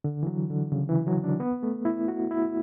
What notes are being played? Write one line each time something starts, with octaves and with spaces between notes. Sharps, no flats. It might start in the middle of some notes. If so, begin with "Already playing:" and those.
D3
E3
F#3
D3
C#3
E3
F#3
D4
B3
A3
E4
F#4
E4